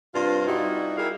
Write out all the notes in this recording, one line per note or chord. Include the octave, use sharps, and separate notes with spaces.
G2 C3 F4
G3 D#4 E4 F#4
E4 G4 G#4 A#4 F5